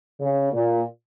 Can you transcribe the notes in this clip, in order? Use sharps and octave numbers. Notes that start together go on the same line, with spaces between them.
C#3
A#2